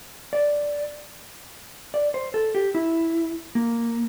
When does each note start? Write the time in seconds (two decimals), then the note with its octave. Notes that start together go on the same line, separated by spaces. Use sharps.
0.33 D5
1.94 D5
2.14 C5
2.34 A4
2.55 G4
2.75 E4
3.55 A#3